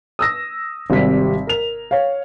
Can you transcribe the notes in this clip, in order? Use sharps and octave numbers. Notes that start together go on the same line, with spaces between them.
D#6 E6 A#6
G#1 C3 G3 B6
A#4 F7
C#5 F5